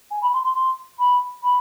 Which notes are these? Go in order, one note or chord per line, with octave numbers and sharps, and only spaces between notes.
G#5
B5
C6
C6
C6
B5
B5